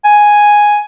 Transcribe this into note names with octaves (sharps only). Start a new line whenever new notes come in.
G#5